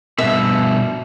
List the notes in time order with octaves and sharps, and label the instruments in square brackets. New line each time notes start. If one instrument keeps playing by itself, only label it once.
[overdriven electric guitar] G2 B2 [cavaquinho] E5